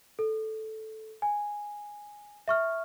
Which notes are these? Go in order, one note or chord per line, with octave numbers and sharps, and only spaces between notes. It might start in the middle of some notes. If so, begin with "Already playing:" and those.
A4
G#5
E5 C#6 F6